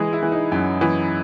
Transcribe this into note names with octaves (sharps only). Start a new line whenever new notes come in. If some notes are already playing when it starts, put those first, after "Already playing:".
Already playing: E3 G#3 G#4
E4
E3
D#4
F#2
E3